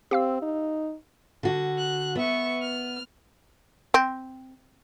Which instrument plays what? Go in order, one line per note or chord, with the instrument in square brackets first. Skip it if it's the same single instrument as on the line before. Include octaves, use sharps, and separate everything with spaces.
[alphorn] C4 [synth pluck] G4 F5 E6
[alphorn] D#4
[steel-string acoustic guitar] D3 F#4
[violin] F#6
[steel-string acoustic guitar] B3 [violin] E5 C#6
[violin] F6
[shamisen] C4